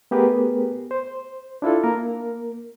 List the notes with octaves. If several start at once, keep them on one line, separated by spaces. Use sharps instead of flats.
A3 B3 G4 G#4 A#4 B4
C5
D4 E4 F4 A4
A#3 A#4